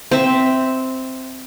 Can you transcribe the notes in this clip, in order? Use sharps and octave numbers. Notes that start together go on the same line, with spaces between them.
C4 E5